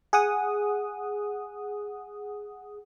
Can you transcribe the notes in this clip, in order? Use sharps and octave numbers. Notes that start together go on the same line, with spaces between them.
G#4 F#5 D#6